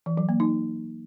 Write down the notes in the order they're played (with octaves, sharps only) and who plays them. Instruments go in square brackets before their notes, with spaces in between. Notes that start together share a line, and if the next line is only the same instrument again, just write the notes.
[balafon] E3
F#3
A#3
D#4